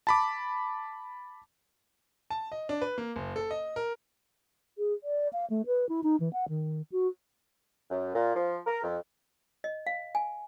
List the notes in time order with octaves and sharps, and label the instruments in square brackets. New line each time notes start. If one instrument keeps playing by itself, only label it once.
[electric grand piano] A5 B5 D6
[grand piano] A5
D#5
D4
B4
A#3
F#1
A4
D#5
A#4
[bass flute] G#4
D5
F5
A3
B4
E4
D#4
E3
F#5
D#3
F#4
[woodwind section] F#2
A#2
F3
A#4
F2
[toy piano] D#5
F5
G#5